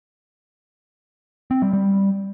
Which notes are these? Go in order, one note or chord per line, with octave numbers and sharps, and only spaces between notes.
C4
G3
G3